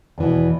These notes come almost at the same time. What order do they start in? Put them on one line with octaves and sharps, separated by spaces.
E2 E3 B2